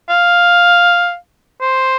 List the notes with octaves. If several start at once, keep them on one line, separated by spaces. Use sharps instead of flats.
F5
C5